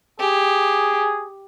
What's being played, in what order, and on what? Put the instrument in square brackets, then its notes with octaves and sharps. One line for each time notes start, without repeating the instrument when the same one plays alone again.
[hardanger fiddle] G4 [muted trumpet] G#4